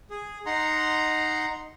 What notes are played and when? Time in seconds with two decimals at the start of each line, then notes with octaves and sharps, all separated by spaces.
0.10 G#4
0.46 D#4 F#5 A#5 C6